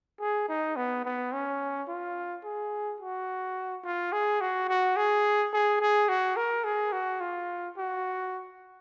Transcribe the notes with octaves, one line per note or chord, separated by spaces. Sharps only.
G#4
D#4
B3
B3
C#4
F4
G#4
F#4
F4
G#4
F#4
F#4
G#4
G#4
G#4
F#4
A#4
G#4
F#4
F4
F#4